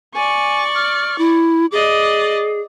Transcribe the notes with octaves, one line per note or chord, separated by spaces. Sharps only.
D5 G#5 C#6
F6
E4
G#4 D5 D#5